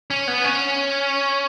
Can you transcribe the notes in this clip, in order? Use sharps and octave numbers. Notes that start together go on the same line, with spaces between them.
C#4
B3
C#4